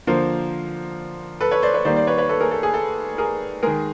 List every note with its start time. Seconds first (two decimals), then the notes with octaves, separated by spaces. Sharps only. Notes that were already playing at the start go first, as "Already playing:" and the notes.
0.07 D3 F3 A#3 A#4 C5
1.40 A4 B4
1.51 B4 C#5
1.62 C5 D5
1.74 B4 C#5
1.85 D#3 G3 A#3 C5 D5
1.96 C5 D5
2.07 B4 C#5
2.18 B4 C#5
2.29 A4 B4
2.41 G#4 A#4
2.51 A4
2.63 G#4
2.74 A4
3.18 G#4 A#4
3.63 D#3 G#3 G#4 A#4